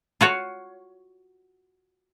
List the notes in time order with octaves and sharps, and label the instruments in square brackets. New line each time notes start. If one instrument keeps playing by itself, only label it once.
[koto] F4 F#4 C#5